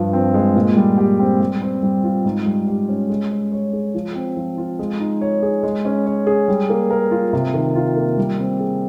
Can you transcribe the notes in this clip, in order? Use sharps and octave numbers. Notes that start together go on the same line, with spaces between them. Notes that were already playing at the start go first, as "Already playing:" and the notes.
Already playing: G2 F3
C4
G#3
A#2
G3
G4
C4
G3
C4
G3
F4
G#2
G3
G4
C#4
G#3
C#4
C#5
G#4
F3
C4
F3
F4
G#3
D#4
C#5
G#4
G#3
C#4
C#5
G#4
G3
A#3
A#4
F4
C3
D#3
F4
A#3
G3
C4
G#4